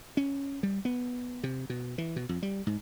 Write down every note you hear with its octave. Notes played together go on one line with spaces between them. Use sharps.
C#4
G3
B3
C3
B2
E3
B2
F2
G3
G#2